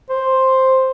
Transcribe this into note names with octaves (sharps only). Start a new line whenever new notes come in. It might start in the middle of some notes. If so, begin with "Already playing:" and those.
C5